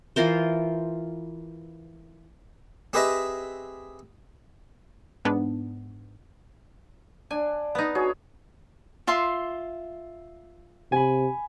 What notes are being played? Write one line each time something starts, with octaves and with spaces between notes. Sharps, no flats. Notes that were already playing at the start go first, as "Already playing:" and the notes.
E3 F4 A#4 C5
C4 G4 G#4 B4 D#5 E5
G#2 B3 D4
D4 G#5
B3 D#4
F#4 G#4 C#5
F4 E5 C6
C3 G#5 B5